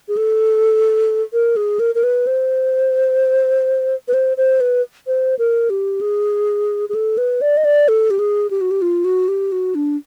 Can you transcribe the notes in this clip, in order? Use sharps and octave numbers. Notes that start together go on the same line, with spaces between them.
G#4
A4
A#4
G#4
A#4
A#4
B4
C5
B4
C5
C5
B4
C5
A#4
G4
G#4
G#4
A4
B4
D5
D#5
D5
A4
G4
G#4
G4
F#4
G4
F4
F#4
G4
F#4
D4